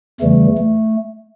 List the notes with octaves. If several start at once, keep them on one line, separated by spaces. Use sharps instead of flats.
E2 C#3 E3 G3 A3
A3